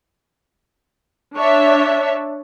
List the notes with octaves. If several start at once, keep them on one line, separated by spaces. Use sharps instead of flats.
D4 C#5 E5